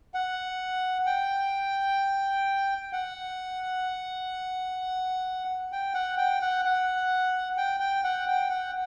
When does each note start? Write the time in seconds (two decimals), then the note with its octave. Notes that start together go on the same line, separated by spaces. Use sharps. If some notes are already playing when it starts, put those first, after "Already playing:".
0.14 F#5
1.07 G5
2.93 F#5
5.72 G5
5.94 F#5
6.18 G5
6.41 F#5
6.65 F#5
7.57 G5
7.80 G5
8.04 F#5
8.28 G5
8.50 F#5